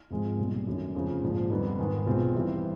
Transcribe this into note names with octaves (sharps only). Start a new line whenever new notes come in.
G#1 G#2 F3 G#3
B1 A#2 G3
F#2 D#3 F#3 A3 D4
G1 F2 C#3 F3 G#3
A#1 G#2 F3
F2 D3 G3 B3 D#4
G#2 D#3 G#3 B3
B1 B2 G#3 C4 F4
G2 E3 G3 C4